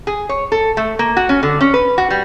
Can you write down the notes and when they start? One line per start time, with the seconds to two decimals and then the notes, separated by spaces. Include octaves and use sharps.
0.07 G#4
0.29 C#5
0.52 A4
0.77 A3
0.99 A#3
1.17 F#4
1.29 C#4
1.43 D3
1.61 C#4
1.74 B4
1.98 F#4
2.10 G3